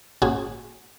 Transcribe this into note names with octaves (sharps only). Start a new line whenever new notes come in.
G#1 A#2 C#4 F#4 G#4